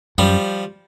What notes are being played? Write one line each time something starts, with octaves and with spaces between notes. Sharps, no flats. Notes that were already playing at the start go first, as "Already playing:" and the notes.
F#2 F3 G3